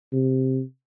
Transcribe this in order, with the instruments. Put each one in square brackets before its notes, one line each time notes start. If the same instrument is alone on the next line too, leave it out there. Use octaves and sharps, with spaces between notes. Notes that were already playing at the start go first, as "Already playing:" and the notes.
[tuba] C3